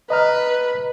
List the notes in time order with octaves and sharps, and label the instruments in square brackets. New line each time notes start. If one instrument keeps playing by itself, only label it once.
[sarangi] B4 [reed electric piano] D#5 A#5 F6